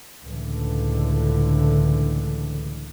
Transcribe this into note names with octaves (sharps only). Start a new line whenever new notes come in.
C#2 A2 D3 E3